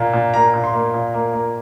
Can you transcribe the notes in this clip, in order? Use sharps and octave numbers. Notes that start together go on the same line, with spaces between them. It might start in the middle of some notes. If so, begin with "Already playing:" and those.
Already playing: A#2 A#3
A#2
A#3 A#5
A#2
C6
A#3
A#2
A#3
A#3